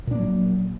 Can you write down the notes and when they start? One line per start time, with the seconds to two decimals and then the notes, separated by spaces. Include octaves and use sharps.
0.07 A#2
0.11 D4
0.15 A#3
0.19 F#3